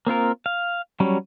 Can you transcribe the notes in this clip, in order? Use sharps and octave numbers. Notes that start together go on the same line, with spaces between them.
A#3 C4 F4 A#4
F5
F#3 G3 C#4